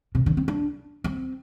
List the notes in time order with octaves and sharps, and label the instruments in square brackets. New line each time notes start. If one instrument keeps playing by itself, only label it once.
[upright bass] C3
D3
C4
D4
C4